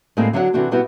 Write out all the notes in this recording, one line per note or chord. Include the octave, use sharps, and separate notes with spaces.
A2 G3 G#3 A#3 C4 G#4
D3 F#3 D4 C#5 E5 F#5
C3 E3 D4 F#4 G4 A4
B2 G3 B3 E4 F#4 G4